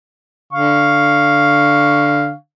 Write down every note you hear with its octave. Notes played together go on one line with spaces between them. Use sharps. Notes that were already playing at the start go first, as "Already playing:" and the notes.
D3 F5 C#6